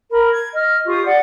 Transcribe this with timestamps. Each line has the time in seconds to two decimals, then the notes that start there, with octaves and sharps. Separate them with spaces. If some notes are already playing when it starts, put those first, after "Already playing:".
0.11 A#4 B5
0.30 G#6
0.54 D#5 F6
0.87 F4 G4 C#6 D#6
1.06 D5 F#5